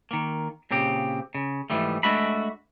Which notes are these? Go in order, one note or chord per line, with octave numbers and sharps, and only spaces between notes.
D#3 A#3
A#2 C#3 C4 G4
C#3
G#2 E3 F3 G3 A3
G#3 A3 D4 F#4 E5 B5